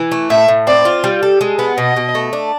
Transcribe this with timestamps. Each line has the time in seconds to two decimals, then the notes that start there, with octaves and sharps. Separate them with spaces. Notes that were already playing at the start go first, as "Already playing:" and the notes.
Already playing: E3
0.12 A3
0.30 A2 E5
0.48 A2
0.67 C4 D5
0.85 F4
1.04 G3
1.23 A4
1.41 G#3
1.59 B3
1.78 B2 D#5
1.96 B2
2.15 A3
2.33 D4